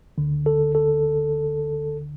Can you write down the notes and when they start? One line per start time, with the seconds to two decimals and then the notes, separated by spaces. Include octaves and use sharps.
0.18 D2 D3
0.46 A4
0.75 A4